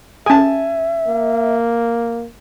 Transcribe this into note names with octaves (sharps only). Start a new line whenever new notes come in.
C#4 G#4 E5 G#5 A5
A#3